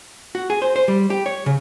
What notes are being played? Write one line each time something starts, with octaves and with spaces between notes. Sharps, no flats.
F#4
G#4
C5
C5
G3
G4
C#5
C#3